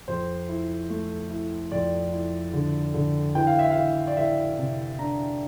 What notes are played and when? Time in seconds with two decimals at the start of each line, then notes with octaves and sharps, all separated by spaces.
0.08 F2 C5
0.49 E4
0.90 A3
1.30 E4
1.72 F2 D5
2.12 E4
2.53 D3
2.94 D3
3.35 E3 G5
3.47 F5
3.59 E5
3.71 F5
3.76 E3
4.07 D5
4.17 E3 E5
4.58 C3
4.99 D4 A#5